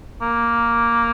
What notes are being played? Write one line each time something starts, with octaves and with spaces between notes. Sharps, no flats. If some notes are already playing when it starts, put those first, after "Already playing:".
A#3